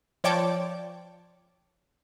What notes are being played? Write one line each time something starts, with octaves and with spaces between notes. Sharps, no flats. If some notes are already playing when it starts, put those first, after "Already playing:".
F3 C#5 D5 G5 A5 D6